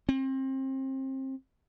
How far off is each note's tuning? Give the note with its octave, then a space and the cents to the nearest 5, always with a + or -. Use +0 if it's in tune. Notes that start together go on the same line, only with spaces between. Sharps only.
C4 +30